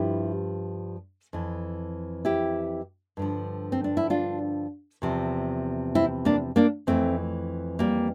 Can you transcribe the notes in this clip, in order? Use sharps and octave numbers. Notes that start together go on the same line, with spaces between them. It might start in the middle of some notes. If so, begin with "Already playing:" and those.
Already playing: G2 F3 E4 G4
F2 E3
E4 G4
G2 D3 F3
C4
D4
E4
D4 F4
E2 C3 F3
C4 E4
A#3 D4
A#3 D4
F2 E3 A3 C4
G3 A#3